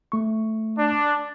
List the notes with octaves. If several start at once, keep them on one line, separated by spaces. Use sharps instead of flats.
A3 C#6
D4